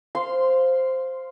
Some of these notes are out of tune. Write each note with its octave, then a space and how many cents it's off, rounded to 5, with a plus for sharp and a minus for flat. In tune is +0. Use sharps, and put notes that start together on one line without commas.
C5 +0 F5 +0 C6 -15